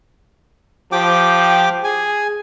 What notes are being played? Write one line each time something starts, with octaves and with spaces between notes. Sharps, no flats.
F3 G4 G5 D6
G#4 G#5